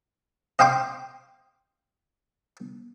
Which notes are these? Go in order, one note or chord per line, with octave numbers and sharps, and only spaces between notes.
D#5 F5 G5 C6 D6